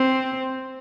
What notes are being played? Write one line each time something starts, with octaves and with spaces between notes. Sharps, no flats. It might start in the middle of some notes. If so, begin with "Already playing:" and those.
Already playing: C4